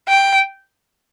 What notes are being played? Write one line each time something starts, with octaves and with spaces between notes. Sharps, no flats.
G5